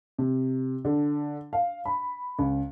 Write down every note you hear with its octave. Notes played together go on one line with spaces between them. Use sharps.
C3
D3
F5
B5
C#2